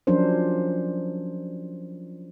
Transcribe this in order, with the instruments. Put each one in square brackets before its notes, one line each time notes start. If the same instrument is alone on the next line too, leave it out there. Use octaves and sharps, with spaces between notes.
[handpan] F3 F#3 C#4 D4 A#4 C5